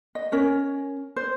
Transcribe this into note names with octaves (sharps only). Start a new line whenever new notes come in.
D#5
C#4 A#4 C#5
C5